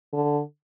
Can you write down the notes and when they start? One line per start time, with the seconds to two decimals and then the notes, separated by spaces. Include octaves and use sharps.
0.13 D3